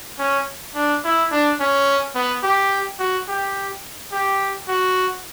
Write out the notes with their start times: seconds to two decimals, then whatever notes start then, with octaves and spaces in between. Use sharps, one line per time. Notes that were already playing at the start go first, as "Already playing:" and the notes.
0.19 C#4
0.75 D4
1.04 E4
1.31 D4
1.60 C#4
2.15 B3
2.43 G4
2.99 F#4
3.28 G4
4.12 G4
4.68 F#4